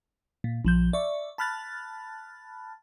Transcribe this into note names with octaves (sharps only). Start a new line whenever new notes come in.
A#2
A#1 F3 G6
D5 E5 C#6
A5 B5 F6 F#6 A6